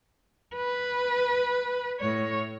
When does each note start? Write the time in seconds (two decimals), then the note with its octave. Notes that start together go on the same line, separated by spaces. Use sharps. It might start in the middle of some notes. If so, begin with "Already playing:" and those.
0.55 B4
2.00 A2 C#5